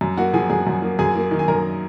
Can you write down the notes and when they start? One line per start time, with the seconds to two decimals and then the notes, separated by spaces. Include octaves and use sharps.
0.01 F#2
0.17 A#3 F#4 F#5
0.34 F3 G#4 G#5
0.50 F#2 G#4 G#5
0.67 F#2
0.82 A#3
0.99 F#2 G#4 G#5
1.15 A#3
1.31 D#3
1.39 G#5
1.48 F#2 A#4 A#5